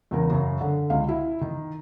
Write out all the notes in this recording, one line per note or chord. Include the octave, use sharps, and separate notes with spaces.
E2 C#3 A#4
F#2 C#3
D3
C#2 F5
E4
D#3